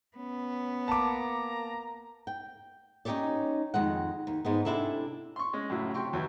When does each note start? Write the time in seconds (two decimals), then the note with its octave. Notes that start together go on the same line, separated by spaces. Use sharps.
0.17 B3 C#4
0.88 A#3 A5 A#5 D6
2.27 G5
3.05 C#4 D#4 E4 G4 C#5 D5
3.74 F2 D#3 G#3 F#5
4.27 D#2
4.45 G#2 G#3 B3
4.65 C3 D4 E4 G#4 A4
5.36 C6 C#6
5.53 G#3 C#4
5.70 F#2 A2 C#3 F#3 E4
5.94 C3 G5 C6 C#6
6.13 D#2 E3 F#3